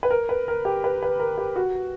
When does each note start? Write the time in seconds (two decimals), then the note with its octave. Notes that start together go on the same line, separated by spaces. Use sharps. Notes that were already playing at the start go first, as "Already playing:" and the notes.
0.03 B4
0.10 A#4
0.29 B4
0.48 A#4
0.65 G4
0.84 B4
1.03 B4
1.19 A#4
1.38 G4
1.56 F#4